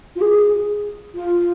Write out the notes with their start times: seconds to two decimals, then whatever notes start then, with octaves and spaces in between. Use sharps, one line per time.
0.16 F4
0.21 G#4
1.15 F4